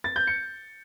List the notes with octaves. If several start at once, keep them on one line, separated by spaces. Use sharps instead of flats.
A6
G6
C#7